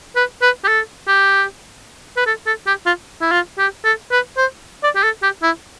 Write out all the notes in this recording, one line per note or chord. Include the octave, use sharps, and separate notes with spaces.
B4
B4
G4
A4
G4
B4
A4
A4
G4
F4
E4
F4
G4
A4
B4
C5
D5
G4
A4
G4
E4